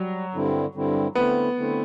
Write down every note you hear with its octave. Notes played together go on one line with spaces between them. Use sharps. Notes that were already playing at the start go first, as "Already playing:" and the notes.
Already playing: F#3 G3
G2 D3 G3 C4 E4
G2 D3 G3 C4 E4
D3 A3 B3 C4 E4
D3 A3 C4 E4